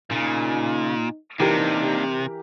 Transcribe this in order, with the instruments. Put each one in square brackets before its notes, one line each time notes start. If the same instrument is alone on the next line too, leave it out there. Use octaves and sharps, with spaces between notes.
[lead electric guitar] A#2 [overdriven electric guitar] C#3 [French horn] D#4
[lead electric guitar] C3 [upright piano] E3 G4 A#4 [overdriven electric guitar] A#3 D4 [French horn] D#4